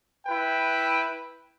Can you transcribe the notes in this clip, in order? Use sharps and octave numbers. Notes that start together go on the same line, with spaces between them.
E4 B4 G5